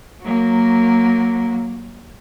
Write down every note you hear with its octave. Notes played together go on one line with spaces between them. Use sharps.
F#3 A#3